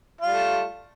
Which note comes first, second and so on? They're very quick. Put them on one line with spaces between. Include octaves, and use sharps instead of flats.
F4 G3 A3